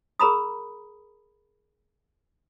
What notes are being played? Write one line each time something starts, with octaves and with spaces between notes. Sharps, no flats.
G#4 A#4 A#5 B5 D#6